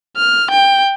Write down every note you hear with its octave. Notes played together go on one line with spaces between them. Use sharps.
F6
G5